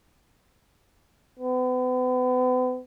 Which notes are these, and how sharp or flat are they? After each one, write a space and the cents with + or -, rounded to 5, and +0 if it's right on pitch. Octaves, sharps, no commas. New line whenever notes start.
B3 +40